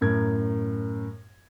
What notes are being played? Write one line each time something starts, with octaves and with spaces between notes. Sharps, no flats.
F#2 A2 A#4 G#6